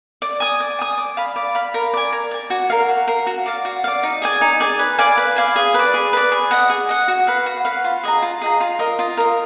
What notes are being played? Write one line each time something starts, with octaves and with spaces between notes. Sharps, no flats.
D5
G#5 D#6
D5
G#5 D#6
D5
F5 B5
D5
F5 B5
A#4
D5 G#5
A#4
D5 G#5
F#4
A#4 F5
F#4
A#4 F5
F#4
D5 F5
F#4
D5 F5
D#4
G#4 D5 G#5
D#4
G#4 D5 G#5
B4
D5 F5 G#5
B4
D5 F5 G#5
G#4
B4 D5
G#4
B4 D5
G#4
D#5 F#5
G#4
D#5 F#5
F#4
B4 F5
F#4
B4 F5
F4
G#4 D#5 A#5
F4
G#4 D#5 A#5
F4
A#4 D#5
F4
A#4 D#5